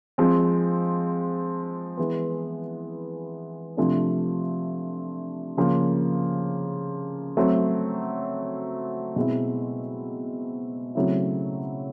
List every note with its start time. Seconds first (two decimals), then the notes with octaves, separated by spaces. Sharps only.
0.18 F3 G#3 C4
1.97 E3 G#3 B3
3.77 C3 F3 A3 D4
5.57 C#3 F3 A#3
7.37 F#3 A3 C4
9.16 B2 G#3 C4 E4
10.95 C#3 F#3 A3 C4 E4